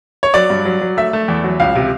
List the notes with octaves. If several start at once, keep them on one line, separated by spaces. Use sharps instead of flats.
C#5
F#3 D5
G2
F#3
F#3
A3 E5
A3
E2
F#3
C#2 F5
C3